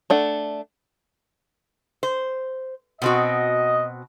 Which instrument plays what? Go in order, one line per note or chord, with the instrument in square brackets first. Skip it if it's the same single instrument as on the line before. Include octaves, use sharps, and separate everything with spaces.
[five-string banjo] A3 D4 F#5
[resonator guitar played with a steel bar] C5
[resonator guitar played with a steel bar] B2 C4 F#4 [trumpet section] D#5